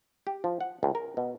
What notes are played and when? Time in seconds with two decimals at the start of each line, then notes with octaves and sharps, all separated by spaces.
0.27 G4
0.44 F3
0.61 F#5
0.83 C#2
0.95 A#4
1.17 B2